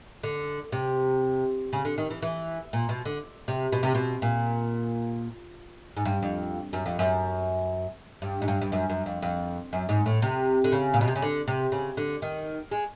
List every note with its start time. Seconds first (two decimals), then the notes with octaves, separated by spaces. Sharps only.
0.23 D3
0.72 C3
1.73 C#3
1.85 D3
1.98 D#3
2.10 E3
2.22 E3
2.73 A#2
2.89 B2
3.06 D3
3.48 C3
3.72 B2
3.83 C3
3.95 B2
4.22 A#2
5.97 G#2
6.05 G2
6.23 F2
6.73 F#2
6.86 F2
6.99 F#2
8.22 G2
8.42 G#2
8.48 G2
8.62 G2
8.72 F#2
8.90 F#2
9.06 F2
9.22 F2
9.73 F#2
9.89 G#2
10.06 A2
10.22 C3
10.64 D3
10.72 C#3
10.94 A#2
11.01 B2
11.08 C3
11.16 C#3
11.22 D3
11.48 C3
11.72 C#3
11.97 D3
12.22 D#3
12.71 G#3